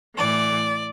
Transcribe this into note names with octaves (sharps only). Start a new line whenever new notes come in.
A2 E3 D5